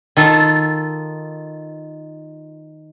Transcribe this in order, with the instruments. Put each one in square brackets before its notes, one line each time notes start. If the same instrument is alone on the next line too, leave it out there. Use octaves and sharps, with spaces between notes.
[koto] D#3 F4 A4